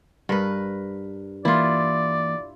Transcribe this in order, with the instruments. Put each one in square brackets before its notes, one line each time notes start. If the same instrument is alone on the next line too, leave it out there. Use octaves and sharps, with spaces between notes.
[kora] G2 A#4 B4
[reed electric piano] E3 A#3 [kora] E4 F4 [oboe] D5